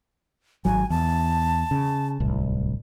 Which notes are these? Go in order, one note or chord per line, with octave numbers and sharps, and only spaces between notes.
G#1 F#3 G#5
E2 A5
C#3
D1 C2